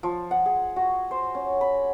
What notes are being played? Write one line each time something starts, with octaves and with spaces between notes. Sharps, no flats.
F3
F#5
G#4
F#4
C5
C#4
B5